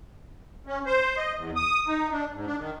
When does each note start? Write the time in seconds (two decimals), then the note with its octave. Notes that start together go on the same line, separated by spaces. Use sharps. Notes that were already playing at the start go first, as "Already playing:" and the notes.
0.67 C#4
0.86 C5
1.17 D#5
1.38 E2
1.56 D#6
1.88 D#4
2.11 D4
2.33 G#2
2.46 D4
2.59 D#3